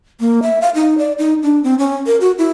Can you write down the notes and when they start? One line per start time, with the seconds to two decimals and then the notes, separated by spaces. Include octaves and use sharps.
0.20 A#3
0.43 E5
0.61 F5
0.75 D#4
0.98 D5
1.18 D#4
1.43 D4
1.64 C4
1.79 C#4
2.06 A#4
2.21 F#4
2.38 E4